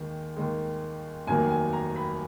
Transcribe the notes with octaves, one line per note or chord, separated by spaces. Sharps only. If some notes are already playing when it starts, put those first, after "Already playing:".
Already playing: D#2 D#3 G#3
D#2 D#3 G#3
F1 D#2 D#3 F#3 A#3 G#5
G#5
A#5
B5